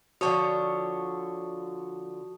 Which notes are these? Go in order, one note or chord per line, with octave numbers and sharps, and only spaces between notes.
D3 F3 F#4 C#5 A5 C#6 D#6